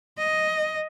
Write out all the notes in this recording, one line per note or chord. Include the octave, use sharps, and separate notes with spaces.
D#5